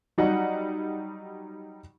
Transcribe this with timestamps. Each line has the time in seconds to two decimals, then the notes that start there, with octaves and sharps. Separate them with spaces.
0.18 F#3 G3 D#4 F#5